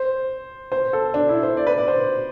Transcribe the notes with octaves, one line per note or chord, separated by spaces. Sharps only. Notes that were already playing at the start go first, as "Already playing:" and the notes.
Already playing: C5
C5
A4
D4
E4
C5
D5
B4
D5
C5